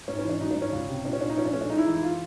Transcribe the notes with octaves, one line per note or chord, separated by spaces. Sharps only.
G#2 C#4
C#4
E3
D4
F#3 D#4
D4
G#2
C#4
C#2
C3
A#2 D4
C#4
A#2 D4
D#4
F3 C#4
D4
A3 C#4
D4
G#3 D#4
E4
E3 D#4
E4
F4